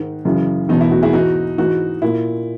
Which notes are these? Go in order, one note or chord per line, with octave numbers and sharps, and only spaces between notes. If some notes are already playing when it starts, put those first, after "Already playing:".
Already playing: G#2 D#3
F#2 C#3 E3
E2 B2 D#4
E4
D#4 F#4
E4 G#4
G#2 E3 D#4 F#4
G#2 E3 D#4 F#4
A#2 E4